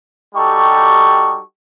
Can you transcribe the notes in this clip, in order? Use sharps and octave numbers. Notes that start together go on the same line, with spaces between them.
G3 D#4 F#4 G4 A4 C#6